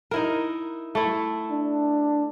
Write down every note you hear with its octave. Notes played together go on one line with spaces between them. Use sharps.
D#4 E4 A#4
A3 E4
D4